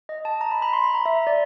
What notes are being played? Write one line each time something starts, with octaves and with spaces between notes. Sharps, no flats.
D#5
A5
A#5
B5
B5
C6
B5
A#5
E5
D5